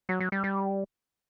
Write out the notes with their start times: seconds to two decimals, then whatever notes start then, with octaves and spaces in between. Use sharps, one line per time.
0.09 F#3
0.20 F#3
0.32 G3
0.44 G3